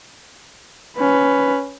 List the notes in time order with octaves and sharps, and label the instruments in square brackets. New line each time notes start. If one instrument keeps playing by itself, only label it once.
[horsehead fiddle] C#4 B4